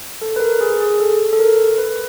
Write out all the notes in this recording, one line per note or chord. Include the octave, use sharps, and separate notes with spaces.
A4
B4
A#4
G#4
G#4
A4
A4
A#4
B4